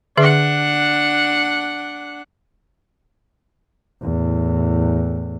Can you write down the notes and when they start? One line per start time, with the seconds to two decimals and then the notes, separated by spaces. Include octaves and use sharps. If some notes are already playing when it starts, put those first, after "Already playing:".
0.17 D3 D4 G#4 E5 F#5
4.02 E2 A2